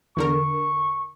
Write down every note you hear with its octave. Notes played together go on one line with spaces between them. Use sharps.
E2 D3 A#4 C#6